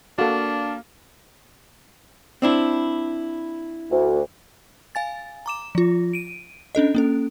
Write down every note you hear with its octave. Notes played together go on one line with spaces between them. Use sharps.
A#3 D4 F#4 A4 F5
C4 D4 E4
D2
F5 G#5 A6
A#5 D6 E7
F3 F4
D7 D#7
C#4 D4 A4 D#5
A#3 C#4 A4